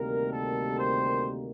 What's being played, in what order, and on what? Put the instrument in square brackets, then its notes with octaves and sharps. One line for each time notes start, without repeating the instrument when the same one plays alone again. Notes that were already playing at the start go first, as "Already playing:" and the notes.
Already playing: [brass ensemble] D2 C3 D#3 G3 A#3 A#4
A4
C5